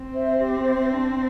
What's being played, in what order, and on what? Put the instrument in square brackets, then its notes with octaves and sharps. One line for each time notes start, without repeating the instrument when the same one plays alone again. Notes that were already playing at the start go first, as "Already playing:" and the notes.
Already playing: [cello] C4
[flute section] C5 E5
G4
C5 E5
D4